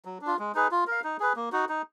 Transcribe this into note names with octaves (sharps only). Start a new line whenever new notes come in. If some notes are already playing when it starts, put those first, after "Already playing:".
F#3
D4
F4
G#3
D#4 G#4 B4
F4
A#4 F5
D#4
G#4 B4
A#3
D#4 F#4
D#4